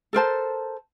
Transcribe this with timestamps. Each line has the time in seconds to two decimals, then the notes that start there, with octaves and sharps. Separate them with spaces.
0.13 A4 A#4 C5 A5